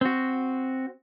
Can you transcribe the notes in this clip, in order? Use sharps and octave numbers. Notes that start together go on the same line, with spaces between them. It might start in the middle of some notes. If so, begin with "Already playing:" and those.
C4 F#4